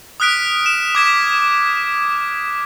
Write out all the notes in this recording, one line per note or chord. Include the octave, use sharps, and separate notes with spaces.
D#6 F6 F#6 B6 D7
E7
D6 G#6 B6